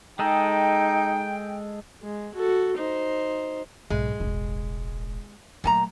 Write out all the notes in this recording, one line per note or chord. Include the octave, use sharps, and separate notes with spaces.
G#3 D#4 G#4 A4 G5 A#5
G#3
F#4 A4
D#4 C5
B1 G#2 G#3
E1 A1
A#2 F#3 A3 G#5 A#5